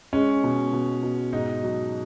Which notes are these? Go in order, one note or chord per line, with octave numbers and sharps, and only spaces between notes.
G#3 C#4
B2
B2
B2
G#2 D#4
F#3